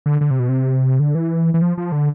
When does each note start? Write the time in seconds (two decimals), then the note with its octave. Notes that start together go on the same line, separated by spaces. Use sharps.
0.06 D3
0.21 D3
0.31 C3
0.39 B2
0.49 C3
1.00 D3
1.15 E3
1.54 E3
1.62 F3
1.78 F3
1.92 D3